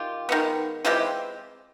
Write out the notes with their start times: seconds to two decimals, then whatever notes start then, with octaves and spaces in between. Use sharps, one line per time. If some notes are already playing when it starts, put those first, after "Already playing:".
Already playing: D#3 F4 G4
0.29 D#3 G#3 B3
0.85 E3 G#3 C4 F4 G4